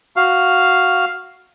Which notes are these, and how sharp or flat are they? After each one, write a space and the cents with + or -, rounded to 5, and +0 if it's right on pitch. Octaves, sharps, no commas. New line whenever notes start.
F#4 +0 F5 +0